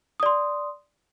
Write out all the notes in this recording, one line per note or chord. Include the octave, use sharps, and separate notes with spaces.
D5 C6 D#6